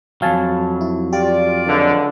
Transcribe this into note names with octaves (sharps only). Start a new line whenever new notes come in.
F2 F#3 F5 G#5 A5
E4
F4 G4 D5
C#2 D3